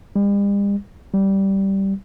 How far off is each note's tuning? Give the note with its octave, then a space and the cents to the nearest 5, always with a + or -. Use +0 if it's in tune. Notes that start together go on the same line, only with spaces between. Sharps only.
G3 +45
G3 -10